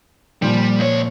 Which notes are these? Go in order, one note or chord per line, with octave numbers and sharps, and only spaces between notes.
A#2 F3 G3
C#2 C#5